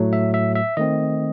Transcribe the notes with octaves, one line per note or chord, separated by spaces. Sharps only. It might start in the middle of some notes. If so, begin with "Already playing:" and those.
Already playing: A2 F#3 A3
E5
E5
E5
D#3 A3 C4 D#5